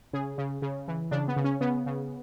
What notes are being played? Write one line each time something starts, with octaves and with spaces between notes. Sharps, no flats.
C#3 G#4
C#3
C#3
E3
C#3 D4
B3
C#3
C#4
C#3 B3
C#3